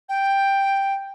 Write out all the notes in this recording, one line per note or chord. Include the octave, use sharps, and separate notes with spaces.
G5